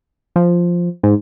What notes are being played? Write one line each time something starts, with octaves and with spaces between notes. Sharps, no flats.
F3
G#2